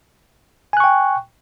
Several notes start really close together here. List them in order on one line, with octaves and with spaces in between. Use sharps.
G#5 F#6 C#6 G5